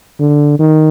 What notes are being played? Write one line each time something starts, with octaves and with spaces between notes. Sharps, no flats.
D3
D#3